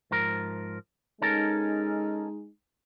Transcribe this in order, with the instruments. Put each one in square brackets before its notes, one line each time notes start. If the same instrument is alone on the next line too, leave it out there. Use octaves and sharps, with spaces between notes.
[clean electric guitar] G#2 F3 A#4
[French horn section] G#3 D#4 [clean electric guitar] C#4 A4 A#4